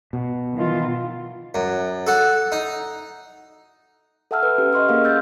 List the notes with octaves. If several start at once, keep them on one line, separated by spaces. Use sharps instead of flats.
B2
D#3 E3 F4
F#2
F#4 A4
D#4
A4 E5 F#5 A5 E6 F6
B4
C#4 G4
D#5 C6 C#6 F6
A#3 C#4 G#4 A#4 F5
E6 G6 A6